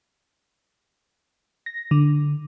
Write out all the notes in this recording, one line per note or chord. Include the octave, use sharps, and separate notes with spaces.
A#6
D3